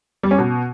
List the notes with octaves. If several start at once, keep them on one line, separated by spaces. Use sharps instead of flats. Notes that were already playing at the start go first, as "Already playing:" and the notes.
G3
C#4
B2